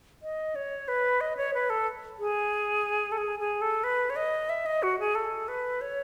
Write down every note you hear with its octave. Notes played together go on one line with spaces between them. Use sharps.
D#5
C#5
B4
D#5
C#5
B4
A4
G#4
A4
G#4
G#4
A4
B4
C#5
D#5
E5
D#5
F#4
G#4
A4
B4
C#5